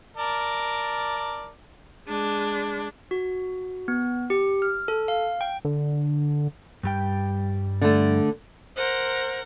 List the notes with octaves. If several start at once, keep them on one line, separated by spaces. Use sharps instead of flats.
A#4 D5 A5
G#3 D4
F#4
B3
G4
F6
A4
F5
G5
D3
G2 G3 G5
D3 A3
A#4 C5 F#5